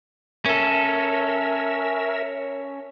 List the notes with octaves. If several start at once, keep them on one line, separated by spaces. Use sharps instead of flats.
C#4 A4 A#4 E5